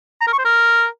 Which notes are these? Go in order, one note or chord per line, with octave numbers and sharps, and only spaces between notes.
A#5
A#4
C#6
C5
A#4